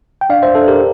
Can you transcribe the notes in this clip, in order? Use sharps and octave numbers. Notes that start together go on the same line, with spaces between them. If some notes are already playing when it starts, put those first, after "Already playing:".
G5
D4 D5 F5
C5 E5
D4 A4
G4 A#4